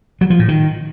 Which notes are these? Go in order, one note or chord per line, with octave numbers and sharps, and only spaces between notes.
F#3
F3
A2
D#3